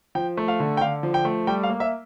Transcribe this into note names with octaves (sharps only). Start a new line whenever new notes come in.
F3 G5
A3
F5
D3
G5
D3 F5
F3
G5
A3
G3 G5
F5
A#3
E5